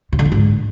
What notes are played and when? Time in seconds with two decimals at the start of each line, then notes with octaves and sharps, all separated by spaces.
0.13 C3
0.19 D3
0.25 F2
0.32 G#2